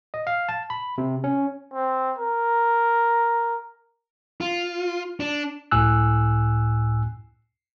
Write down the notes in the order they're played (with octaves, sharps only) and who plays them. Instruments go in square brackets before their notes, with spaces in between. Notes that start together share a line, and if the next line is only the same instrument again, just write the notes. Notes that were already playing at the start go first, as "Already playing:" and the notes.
[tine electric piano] D#5
F5
A5
B5
C3
C#4
[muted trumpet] C4
A#4
[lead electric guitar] F4
D4
[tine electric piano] C#2 A2 G#5 E6 F#6